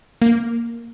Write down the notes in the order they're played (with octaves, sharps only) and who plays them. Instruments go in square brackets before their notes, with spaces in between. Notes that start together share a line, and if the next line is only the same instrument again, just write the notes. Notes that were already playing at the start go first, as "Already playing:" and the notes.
[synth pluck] A#3